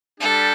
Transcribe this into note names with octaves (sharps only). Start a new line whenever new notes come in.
G3 D4 G4 A4